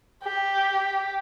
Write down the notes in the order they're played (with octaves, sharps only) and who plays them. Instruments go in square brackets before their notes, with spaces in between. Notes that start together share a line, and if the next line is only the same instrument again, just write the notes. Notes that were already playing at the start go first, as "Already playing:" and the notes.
[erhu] G4